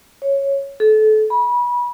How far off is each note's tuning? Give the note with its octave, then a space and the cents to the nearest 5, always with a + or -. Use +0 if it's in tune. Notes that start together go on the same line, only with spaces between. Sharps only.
C#5 -5
A4 -30
B5 -30